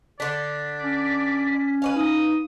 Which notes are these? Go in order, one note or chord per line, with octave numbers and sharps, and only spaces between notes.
D3 D4 D5 B6
C#4
B4 C#5 F5 G#5
D#4 D#6